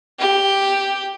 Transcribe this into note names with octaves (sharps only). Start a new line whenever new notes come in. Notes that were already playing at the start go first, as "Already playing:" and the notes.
G4